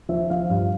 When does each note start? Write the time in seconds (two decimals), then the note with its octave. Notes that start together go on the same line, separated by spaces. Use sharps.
0.09 F3 E5
0.30 F3 F5
0.50 G2 F5